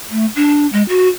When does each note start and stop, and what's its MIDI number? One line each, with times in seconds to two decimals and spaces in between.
0.10 0.26 57
0.36 0.67 62
0.73 0.83 56
0.89 1.08 66